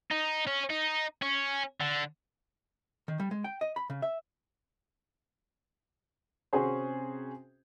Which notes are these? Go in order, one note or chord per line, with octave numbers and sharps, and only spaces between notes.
D#4
C#4
D#4
C#4
D3
D#3
G3
G#3
G5
D#5
B5
C#3
E5
C3 C4 C#4 F#4 G#4 C5